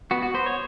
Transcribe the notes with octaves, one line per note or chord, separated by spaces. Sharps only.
B3 F#4
F#4
B3 C5
C#5